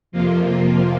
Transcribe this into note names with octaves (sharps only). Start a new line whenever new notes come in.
F2 C3 F3 A#3 F4